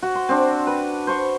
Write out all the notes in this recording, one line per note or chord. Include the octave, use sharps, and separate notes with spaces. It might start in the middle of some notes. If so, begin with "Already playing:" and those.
F#4
C6
C4 D4
B4
C5 C#6